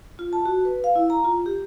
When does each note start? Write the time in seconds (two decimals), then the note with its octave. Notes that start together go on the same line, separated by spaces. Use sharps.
0.19 F4
0.33 A5
0.46 F#4
0.65 B4
0.84 F5
0.95 E4
1.10 A#5
1.24 F4
1.46 G4